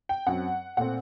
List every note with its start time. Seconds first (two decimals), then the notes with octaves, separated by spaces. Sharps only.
0.09 G5
0.27 F#2 F#3 C4 F#5
0.77 A#2 A3 C4 F#5